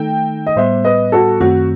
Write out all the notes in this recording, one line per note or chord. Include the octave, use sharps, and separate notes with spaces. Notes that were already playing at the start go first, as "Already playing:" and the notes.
Already playing: D#3 A3 D#4 A4 G5
D#5
A2 G3 B3 C5 E5
B4 D#5
F#4 A4
F#2 D#3 A3 C4 F#4